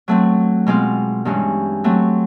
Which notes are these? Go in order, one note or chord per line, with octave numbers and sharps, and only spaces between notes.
F#3 A3 C4
B2 G#3 C4 F4
G2 E3 G#3 C#4
F#3 A3 C4